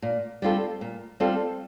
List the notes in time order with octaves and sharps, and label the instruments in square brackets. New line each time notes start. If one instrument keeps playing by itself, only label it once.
[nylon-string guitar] A#2
G3 C4 F4 A4
A#2
G3 C4 F4 A4